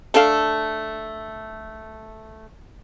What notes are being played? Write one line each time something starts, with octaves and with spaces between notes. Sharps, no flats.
A3 D4 A4 F5